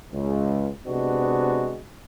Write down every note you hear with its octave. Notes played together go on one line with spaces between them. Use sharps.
C#2
C3 G#3 B3 D4 F#4 D#5